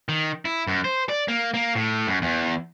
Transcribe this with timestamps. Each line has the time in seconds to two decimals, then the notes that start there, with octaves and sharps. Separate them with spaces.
0.09 D#3
0.45 E4
0.67 F#2
0.84 C5
1.09 D5
1.28 A#3
1.54 A#3
1.76 A2
2.07 F#2
2.22 E2